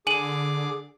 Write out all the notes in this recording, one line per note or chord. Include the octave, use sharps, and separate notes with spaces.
D3 G#4 G#5 D6 D#7 F#7